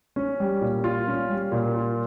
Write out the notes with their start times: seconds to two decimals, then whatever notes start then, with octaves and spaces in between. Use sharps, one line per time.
0.16 C#4
0.40 G3
0.61 A#2
0.84 F4
1.07 C#4
1.30 G3
1.52 A#2
1.75 F4